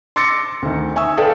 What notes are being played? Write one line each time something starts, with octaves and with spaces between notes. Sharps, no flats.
C6 D6 E6 A6 A#6 C#7
D2 D#3
E5 G#5 C#6 D#6 E6
G#4 A4 B4 D5 F5 G5